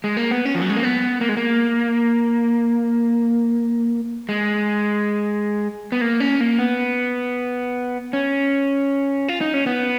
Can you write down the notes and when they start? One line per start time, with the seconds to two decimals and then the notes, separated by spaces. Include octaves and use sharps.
0.04 G#3
0.17 A#3
0.31 B3
0.45 C#4
0.55 F3
0.62 F#3
0.70 G#3
0.76 A#3
0.83 B3
1.21 A#3
1.29 G#3
1.37 A#3
4.29 G#3
5.92 B3
6.01 A#3
6.20 C#4
6.40 A#3
6.59 B3
8.13 C#4
9.28 F4
9.41 D#4
9.54 C#4
9.66 B3